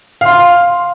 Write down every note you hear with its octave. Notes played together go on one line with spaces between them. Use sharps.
F5 C6